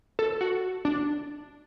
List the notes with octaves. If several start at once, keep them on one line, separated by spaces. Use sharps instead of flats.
A4
F#4
D4